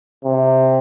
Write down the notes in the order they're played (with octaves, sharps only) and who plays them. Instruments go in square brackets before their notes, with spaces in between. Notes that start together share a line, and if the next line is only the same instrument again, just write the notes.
[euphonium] C3